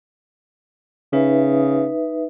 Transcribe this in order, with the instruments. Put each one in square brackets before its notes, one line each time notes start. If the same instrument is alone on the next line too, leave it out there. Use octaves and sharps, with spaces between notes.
[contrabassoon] C#3 [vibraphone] D#4 B4 E5